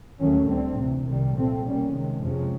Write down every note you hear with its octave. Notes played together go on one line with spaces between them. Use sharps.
D#2 D#3 F#3 A3 C#4
D2 D3 G3 C4
D2 C3 E3
C2 C3 D#3 G3
A#2 F3 A3 C4
B2 G3 A#3 C#4
C3 D#3 G#3
F2 C3 F3 G#3 C#4